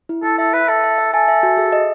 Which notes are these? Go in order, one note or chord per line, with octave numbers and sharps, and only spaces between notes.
E4
E4 A4
A4 E5
B4 E5
A4 E5
E5
E5
A4 G#5
E5
F#4
G#4
D#5